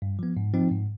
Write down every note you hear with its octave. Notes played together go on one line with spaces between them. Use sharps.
G2
F3 B3
G#2
F3 C4 D#4
G#2